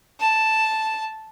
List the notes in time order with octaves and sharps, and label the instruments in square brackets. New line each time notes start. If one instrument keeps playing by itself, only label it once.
[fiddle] A5